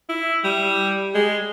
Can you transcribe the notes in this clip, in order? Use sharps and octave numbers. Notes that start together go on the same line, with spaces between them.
E4
G3
G#3